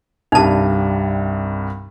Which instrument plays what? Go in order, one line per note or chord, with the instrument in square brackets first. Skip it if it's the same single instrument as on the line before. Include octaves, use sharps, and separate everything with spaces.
[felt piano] C2 G2 [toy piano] D#4 A5